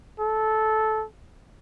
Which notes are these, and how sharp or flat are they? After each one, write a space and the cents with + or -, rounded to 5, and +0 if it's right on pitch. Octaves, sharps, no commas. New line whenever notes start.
A4 -15